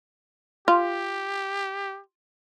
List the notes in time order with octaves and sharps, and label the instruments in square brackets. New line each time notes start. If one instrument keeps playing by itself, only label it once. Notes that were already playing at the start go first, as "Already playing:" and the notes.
[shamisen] F4 [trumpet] G4